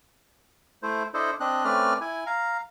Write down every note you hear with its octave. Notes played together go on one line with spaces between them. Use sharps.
A3 E4 C5
D4 E4 A4 C5 D#5
C4 D4 D#5 F#6
A3 C4 C#4 B4 D5 F6
E4 G#5
F5 A#5